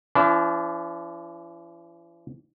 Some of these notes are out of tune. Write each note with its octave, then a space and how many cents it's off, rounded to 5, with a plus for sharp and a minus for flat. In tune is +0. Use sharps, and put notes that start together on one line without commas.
E3 +45 D4 -35